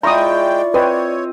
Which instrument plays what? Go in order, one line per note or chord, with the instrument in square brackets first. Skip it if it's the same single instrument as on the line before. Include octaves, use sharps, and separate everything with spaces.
[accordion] G#3 G5 [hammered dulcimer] E4 F4 C#6 [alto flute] D5 [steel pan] A#5 D#6
[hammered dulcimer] C4 D#5 [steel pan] B4 G5 [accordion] C#5